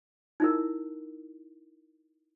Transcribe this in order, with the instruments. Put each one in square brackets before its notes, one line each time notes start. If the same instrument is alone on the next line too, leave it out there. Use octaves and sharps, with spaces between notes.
[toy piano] D#4 E4 A#4